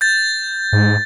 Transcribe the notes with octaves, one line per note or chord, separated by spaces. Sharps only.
G6 A6
G#2